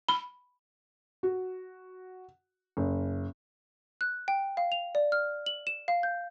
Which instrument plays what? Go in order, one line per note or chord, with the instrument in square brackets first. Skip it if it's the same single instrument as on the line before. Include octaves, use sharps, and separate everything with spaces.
[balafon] B5
[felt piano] F#4
F#1
[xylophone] F#6
G5
F5
F7
D5
F6
F#7
E7
F5
G6